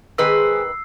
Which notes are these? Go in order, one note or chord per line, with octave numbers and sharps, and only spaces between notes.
D#3 G#3 C4 G#4 B4 E6 C7